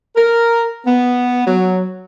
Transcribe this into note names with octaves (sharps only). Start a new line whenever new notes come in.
A#4
B3
F#3